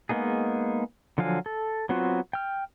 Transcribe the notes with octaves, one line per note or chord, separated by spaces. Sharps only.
G#3 A#3 B3 D#4 G#4
D3 F3 F#3 F5 G#5
A4
F#3 B3 C4 F4 F#4
G5 F6